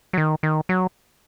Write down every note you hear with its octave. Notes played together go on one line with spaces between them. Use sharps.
F#3
D#3
D#3
F#3